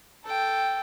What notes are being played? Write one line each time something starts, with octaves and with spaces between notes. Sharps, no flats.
A4 G5